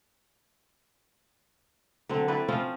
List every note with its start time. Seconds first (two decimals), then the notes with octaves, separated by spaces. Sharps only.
2.09 D3 F#3 C4
2.28 C4 E4 B4 D5
2.48 F3 C4 C#4 F4